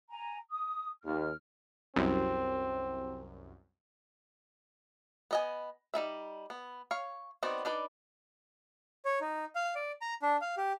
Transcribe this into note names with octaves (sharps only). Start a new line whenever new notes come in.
G#5 A#5
D#6
D#2 F6
C2 F#2 C4
B3 D#5 G#5
G3 D#4 E4 E5
B3
C#5 F5
B3 C4 D#4 F#4 D5
D4 D#4 B4 D5
C#5
D#4
F5
D5
A#5
D4
F5
G4